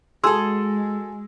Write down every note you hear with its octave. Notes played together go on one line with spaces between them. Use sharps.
G#3 F#4 G#4 A4 G#5 C6 E6